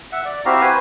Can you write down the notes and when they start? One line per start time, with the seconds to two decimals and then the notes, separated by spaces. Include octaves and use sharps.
0.12 E5 F#5
0.25 D5
0.46 C4 E4 F#4 G4 F5 A#5
0.61 B4 C5 G#5